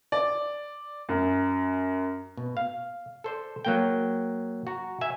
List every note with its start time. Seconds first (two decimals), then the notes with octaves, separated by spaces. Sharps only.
0.12 D5
1.09 F#2
2.37 B2
2.57 F5
3.24 A4 C5 D5
3.65 F#3 A#3 G5
4.67 F#4 A#5
5.01 E5 G#5